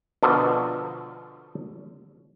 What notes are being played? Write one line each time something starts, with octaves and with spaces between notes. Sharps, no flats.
B2 D3 F3 A4